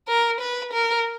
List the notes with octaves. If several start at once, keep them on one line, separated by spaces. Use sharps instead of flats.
A#4
B4
A#4